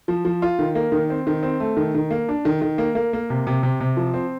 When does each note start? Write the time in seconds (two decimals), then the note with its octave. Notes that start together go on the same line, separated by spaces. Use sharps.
0.08 F3
0.25 F3
0.42 F4
0.59 D#3
0.75 A#3
0.92 D#3
1.10 C4
1.27 D#3
1.43 C4
1.60 A3
1.77 D#3
1.95 D#3
2.11 A#3
2.29 D4
2.45 D#3
2.62 D#3
2.78 A#3
2.95 A#3
3.13 A#3
3.30 C3
3.47 C3
3.63 C3
3.80 C3
3.97 F3
4.14 C4